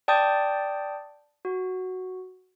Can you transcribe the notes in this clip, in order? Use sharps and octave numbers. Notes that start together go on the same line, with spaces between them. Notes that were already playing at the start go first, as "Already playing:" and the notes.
D5 G5 A5 D#6 G6 A6
F#4